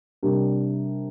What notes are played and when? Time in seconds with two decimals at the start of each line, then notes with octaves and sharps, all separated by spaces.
0.23 C3 G3 D4 G4 A#4